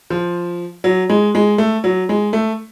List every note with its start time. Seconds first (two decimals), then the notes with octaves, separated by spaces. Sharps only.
0.10 F3
0.84 F#3
1.10 G#3
1.35 G#3
1.58 A3
1.84 F#3
2.09 G#3
2.33 A3